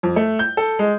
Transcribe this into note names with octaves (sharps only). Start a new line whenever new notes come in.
F2
A3
G6
A4
G#3